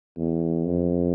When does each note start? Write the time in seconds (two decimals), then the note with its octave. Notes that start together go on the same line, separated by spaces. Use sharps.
0.18 E2
0.65 F2